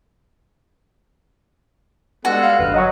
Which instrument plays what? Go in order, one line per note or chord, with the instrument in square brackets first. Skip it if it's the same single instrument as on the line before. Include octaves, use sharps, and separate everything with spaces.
[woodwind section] G3 G#3 A4 [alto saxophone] B3 [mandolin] F#4
[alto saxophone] F5
[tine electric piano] G1 G2 F6 [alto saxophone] B4
[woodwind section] F#3 [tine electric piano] D#5 F#5 C#6